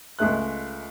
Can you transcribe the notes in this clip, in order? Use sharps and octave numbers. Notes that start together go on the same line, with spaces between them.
C#2 G#3 A3 F#6